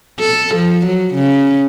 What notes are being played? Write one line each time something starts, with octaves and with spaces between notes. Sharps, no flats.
A4
F3
F#3
C#3